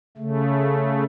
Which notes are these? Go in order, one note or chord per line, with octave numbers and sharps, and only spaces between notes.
C#3 A3